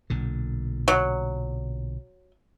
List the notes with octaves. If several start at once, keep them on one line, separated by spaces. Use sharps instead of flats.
B1 A#2 D3
F#3